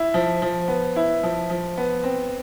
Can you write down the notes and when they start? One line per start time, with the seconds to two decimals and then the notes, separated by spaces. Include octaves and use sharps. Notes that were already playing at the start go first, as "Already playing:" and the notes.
Already playing: E4
0.14 F3
0.42 F3
0.68 B3
0.96 E4
1.23 F3
1.50 F3
1.77 B3
2.03 C4